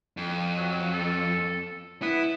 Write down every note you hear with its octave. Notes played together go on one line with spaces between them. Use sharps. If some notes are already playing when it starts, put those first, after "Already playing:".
F2
F#3
A4
B3 E4